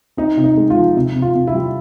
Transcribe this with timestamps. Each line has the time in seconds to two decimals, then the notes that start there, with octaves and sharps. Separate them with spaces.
0.17 C4 D#4
0.37 C3
0.44 D#4
0.57 G#3
0.70 F4
0.77 F3
0.96 C3
1.16 C3
1.22 F4
1.35 C3
1.47 E4
1.54 G3